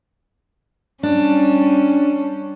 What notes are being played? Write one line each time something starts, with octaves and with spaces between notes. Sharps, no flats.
G3 C#4 D4